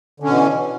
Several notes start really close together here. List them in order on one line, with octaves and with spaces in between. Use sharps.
D3 C#4 B2 E3